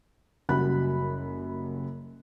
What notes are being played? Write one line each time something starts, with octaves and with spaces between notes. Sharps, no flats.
F#1 F#2 G3 F#4 B5 F#6